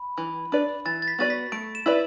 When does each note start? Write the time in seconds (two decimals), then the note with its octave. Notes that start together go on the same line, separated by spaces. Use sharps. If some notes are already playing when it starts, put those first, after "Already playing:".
Already playing: B5
0.18 E3
0.52 D4 B4 D5
0.85 E3 A6
1.02 A6
1.08 B6
1.19 B3 F#4 B4 D5 A6
1.30 B6
1.52 A3 D7
1.75 E7
1.86 E4 B4 D5